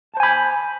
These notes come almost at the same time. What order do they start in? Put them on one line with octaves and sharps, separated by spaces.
A5 C5 G#5 B5